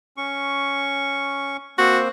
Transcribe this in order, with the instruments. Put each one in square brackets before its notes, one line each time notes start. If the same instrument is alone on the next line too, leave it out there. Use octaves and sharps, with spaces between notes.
[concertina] C#4 C#6
[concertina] A#3 C4 C5 [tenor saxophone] F#4